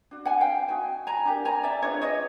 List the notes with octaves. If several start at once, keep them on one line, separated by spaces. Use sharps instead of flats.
D4 F#4
F#5 G#5
F5 G5
D#4 F#4 G#5
G#5 A#5
D4 G4 A#4
G#5 A#5
D5 E5
D4 F4 G#4 B4 C#5 D#5
C#5 D#5